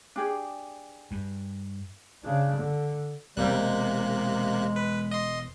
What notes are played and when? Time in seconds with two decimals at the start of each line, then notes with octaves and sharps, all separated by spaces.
0.16 D4 G4 G#4
1.11 G2
2.24 C#3 D4
2.56 D3
3.37 E1 C3 G3 A#3 F#6
3.53 G#3
4.76 B4
5.11 D#5 C6